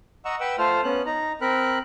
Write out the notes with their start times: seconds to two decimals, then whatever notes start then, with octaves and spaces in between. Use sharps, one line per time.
0.25 D#5 F#5 A#5 C#6 E6
0.40 B4 F#5 G5 E6
0.58 A3 F4 C5 F6
0.84 B3 C#4 F#6
1.06 D#4 A#5
1.41 C4 A#4 B5 F#6